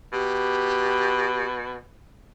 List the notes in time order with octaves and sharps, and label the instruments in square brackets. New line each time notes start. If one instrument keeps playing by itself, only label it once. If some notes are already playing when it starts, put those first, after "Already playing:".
[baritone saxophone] B2 [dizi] G4